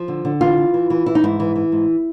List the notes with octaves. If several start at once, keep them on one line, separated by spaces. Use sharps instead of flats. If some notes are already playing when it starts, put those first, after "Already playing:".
Already playing: F3
D3
D3
E3 F4
E3
E3
E3
E3 E4
D#4
G#2 E4
E3
E3
G#2